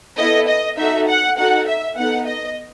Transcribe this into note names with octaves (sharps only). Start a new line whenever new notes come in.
B3 E4 A4 D#5
D#5
D#4 F#4 A4 E5
F#5
D#4 F#4 A4 F#5
E5
B3 D#4 A4 F#5
D#5